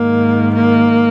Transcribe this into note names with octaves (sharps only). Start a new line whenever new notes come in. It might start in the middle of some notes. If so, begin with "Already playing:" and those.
Already playing: G#2 D#3 A#3
A#3